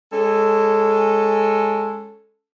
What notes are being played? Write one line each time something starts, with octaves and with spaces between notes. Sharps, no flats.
G#3 C#4 A4